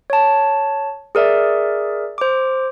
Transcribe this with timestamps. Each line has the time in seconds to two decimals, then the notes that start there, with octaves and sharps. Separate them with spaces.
0.10 C#5 A5
1.15 G#4 A#4 D5 E5
2.18 C5 D6